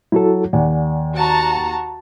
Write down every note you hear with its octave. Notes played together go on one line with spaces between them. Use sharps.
F#3 E4 F#4 A4
D#2 D5 F#5 G#5
F#4 A5 A#5